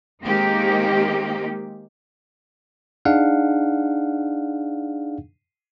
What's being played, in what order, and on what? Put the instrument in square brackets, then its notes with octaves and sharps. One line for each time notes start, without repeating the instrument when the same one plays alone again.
[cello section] D#3 G#3 A#3 C4 D#4 G4
[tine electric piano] D4 D#4 G#4 F5 F#5